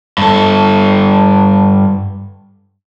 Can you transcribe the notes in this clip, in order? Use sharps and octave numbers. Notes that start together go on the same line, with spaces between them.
G2 A4